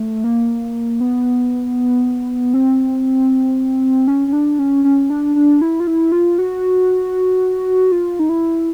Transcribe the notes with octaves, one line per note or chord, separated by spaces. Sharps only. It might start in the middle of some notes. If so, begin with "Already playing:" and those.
Already playing: A3
A#3
B3
C4
C#4
C#4
D4
C#4
C#4
D4
D4
E4
F4
E4
F4
F#4
F4
D#4
E4